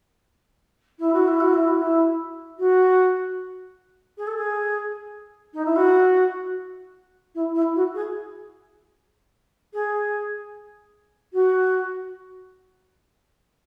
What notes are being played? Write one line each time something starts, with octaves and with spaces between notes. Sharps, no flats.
E4
F#4
E4
F#4
E4
F#4
E4
F#4
G#4
A4
G#4
D#4
E4
F#4
E4
E4
F#4
G#4
G#4
F#4